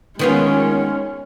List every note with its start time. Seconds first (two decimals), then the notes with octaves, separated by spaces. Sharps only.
0.19 D#3 G#3 B3 C#4 F4